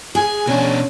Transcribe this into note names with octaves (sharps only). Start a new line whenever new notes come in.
G#4 G#5
B2 C#4 D4